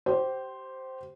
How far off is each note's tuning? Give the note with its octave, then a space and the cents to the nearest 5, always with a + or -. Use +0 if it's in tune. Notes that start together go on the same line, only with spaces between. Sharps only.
G4 -25 C5 +0